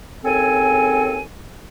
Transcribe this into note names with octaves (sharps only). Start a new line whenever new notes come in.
D#2 C#3 C4 A4 G#5